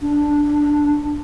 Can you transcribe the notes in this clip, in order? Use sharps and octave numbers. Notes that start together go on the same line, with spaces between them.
D4